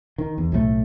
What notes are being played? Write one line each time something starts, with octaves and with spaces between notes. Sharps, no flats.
D#3
E2
B1 A2 D#3 A3